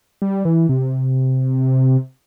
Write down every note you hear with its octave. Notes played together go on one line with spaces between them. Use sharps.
G3
E3
C3